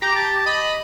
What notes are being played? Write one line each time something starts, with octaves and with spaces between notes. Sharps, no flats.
G4 A#5
A5
D#5 B5